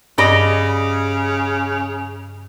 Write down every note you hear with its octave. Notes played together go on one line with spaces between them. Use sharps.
G2 C#3 D5 D#5 B5 A#6